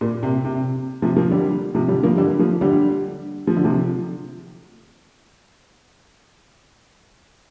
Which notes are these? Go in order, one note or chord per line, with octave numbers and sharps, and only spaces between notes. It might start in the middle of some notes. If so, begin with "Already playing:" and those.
A#2
C3
C3
C3 F3
F3 A#3
D3 G3
C3 F3
D3 G3
F3 A#3
D3 G3
F3 A#3
D3 G3
F3
D3
C3 F3